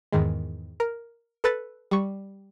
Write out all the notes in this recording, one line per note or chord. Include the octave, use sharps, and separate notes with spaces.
E2 G#2 D#3 G#3
A#4
A4 B4 A6
G3 C#6